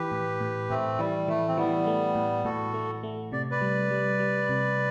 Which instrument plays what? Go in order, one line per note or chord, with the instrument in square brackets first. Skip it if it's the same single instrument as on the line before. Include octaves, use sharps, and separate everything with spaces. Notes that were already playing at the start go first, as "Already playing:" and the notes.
Already playing: [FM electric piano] E3 [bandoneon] G4 B4
[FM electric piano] A2
A2
[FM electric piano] A2 [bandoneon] A3 C4
[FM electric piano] E3 [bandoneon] G3
[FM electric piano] E3 [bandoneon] A3
[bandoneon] C4
[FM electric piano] E3 [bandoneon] G3 B3
[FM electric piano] A3
A2
[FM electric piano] A2 [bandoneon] F#4 A4
[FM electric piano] A3
A3
[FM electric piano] C3 [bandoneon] D5
[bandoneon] B4 D5
[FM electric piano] G3
G3
G3
C3